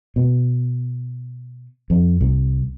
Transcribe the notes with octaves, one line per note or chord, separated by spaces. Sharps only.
B2
F2
C2